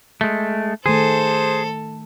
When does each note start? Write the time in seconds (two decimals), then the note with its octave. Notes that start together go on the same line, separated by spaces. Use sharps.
0.21 G#3 A3
0.86 D#3 A3 G#4 A4 C5